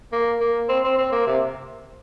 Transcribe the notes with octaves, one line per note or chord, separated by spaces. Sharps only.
A#3
A#3
C4
C4
C4
A#3
C3